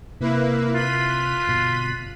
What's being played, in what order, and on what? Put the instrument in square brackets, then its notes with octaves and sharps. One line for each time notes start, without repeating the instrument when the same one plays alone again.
[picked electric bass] C3 [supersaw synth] A#3 E4 B4
[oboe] F4 [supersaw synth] F#6 B6 D#7
[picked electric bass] G1 B2